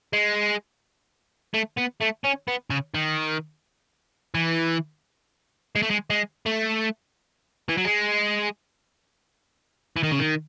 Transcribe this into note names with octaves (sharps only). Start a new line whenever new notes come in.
G#3
A3
B3
A3
C#4
B3
C#3
D#3
E3
G#3
A3
G#3
G#3
A3
E3
F#3
G#3
E3
D#3
C#3
D#3